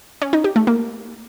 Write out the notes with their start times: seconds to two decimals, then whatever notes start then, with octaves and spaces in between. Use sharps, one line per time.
0.22 C#4
0.33 D#4
0.44 G4
0.56 A3
0.67 A#3